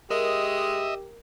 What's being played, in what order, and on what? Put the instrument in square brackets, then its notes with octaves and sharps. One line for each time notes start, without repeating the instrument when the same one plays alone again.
[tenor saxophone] G#3 [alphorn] G4 [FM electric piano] A#4 [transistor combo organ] D#5 E5